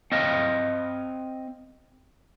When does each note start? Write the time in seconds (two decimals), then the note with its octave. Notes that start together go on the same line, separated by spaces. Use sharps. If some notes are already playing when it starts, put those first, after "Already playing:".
0.12 C4 D#5 F5